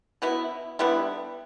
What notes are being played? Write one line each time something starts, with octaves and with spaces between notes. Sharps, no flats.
B2 B3 E4
D3 G3 B3 E4